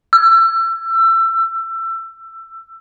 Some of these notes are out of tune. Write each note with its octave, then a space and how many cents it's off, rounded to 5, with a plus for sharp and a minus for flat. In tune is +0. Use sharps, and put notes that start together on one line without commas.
E6 +25